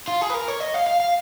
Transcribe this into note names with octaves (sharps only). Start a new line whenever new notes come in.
F4
G#4
B4
A#4
C#5
D#5
F5
F5
F5